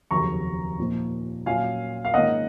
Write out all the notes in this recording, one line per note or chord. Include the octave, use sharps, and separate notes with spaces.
F1 D#2 C#3 F#3 A#5 C#6
A#2 F3 A#3 D#4
A#2 F#3 C#4 F5 G#5
F5
G#2 D#3 A#3 C#4 D#5 F#5